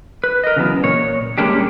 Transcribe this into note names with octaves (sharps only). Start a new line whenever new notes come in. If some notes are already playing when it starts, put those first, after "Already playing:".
B4
A#4 D#5
C#3 E3 F#3 B3
A#2 C#5
G3 G#3 A#3 C#4 D4 G4